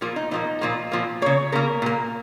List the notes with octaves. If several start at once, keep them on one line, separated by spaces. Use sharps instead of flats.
A#2 F3 A#3 F4
D#4
A#2 F3 A#3 D#4
A#2 F3 A#3 F4
A#2 F3 A#3
C#3 A#3 C#5
C#3 A#3 A#4
A#2 A#3